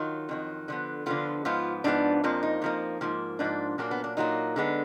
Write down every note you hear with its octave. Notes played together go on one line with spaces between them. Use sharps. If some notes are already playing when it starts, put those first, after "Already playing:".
Already playing: D#3 F#3 F4
F2 D#3 F#3
D3 F3 B3
D3 F3 B3 F4
G#2 F3 B3 F4
G#2 F3 B3 D4
F2 F3 A#3
D#4
F2 F3 A#3
G#2 F3 A#3
G#2 F3 A#3 D4
A#2 F#3 A#3 D4
B3
D4
A#2 F#3 A#3 D#4
D3 G#3 B3